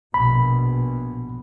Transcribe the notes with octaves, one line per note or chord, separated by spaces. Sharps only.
A#1 B2 B5